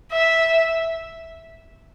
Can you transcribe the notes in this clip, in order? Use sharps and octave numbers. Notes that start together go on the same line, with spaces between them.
E5